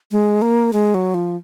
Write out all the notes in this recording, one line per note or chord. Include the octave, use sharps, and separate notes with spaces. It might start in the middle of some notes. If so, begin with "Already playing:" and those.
G#3
A#3
G#3
F#3
F3